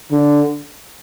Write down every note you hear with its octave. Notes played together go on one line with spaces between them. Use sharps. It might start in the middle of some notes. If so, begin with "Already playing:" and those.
D3